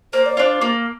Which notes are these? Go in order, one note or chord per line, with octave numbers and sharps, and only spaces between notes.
A#3 C5
D5
D4 F4 C5
A#3